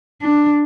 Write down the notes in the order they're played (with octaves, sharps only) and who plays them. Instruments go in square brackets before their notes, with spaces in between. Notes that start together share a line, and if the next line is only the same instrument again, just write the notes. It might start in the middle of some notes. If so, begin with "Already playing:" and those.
[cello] D4